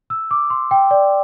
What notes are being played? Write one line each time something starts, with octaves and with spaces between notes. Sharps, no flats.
E6
D6
C6
G5
D5